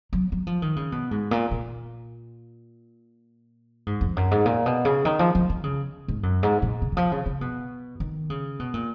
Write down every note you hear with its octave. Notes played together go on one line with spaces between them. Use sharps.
F#3
F#3
F3
D#3
C#3
B2
G#2
A#2
A#2
G#2
F2
F#2
G#2
A#2
B2
C#3
D#3
F3
F3
D#3
C#3
G#2
F#2
G#2
A#2
C#3
D#3
F3
C#3
C#3
B2
D#3
C#3
B2
A#2